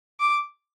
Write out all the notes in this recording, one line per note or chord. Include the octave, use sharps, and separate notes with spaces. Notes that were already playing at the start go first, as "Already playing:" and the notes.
D6